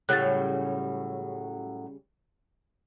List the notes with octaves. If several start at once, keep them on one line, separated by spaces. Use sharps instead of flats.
A2 C#3 F#3 G3 C#4 F#6 A6